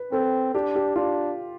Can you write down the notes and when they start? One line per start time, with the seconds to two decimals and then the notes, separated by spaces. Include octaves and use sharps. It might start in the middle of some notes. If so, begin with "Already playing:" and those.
Already playing: B4
0.12 C4 A4
0.54 D4 G4
0.76 G4
0.96 D4 F4